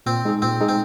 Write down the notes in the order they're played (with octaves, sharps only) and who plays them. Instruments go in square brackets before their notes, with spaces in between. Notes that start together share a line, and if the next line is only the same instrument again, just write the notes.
[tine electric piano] A#2 [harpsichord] C4
[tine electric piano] G#3 D#4 G#4
[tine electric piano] A#2 [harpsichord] C4
[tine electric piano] G#3 D#4 G#4
[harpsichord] C4